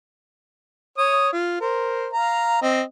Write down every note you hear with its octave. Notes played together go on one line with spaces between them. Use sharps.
C#5 D#6
F4
A#4 C5
F5 A#5
C4 D#5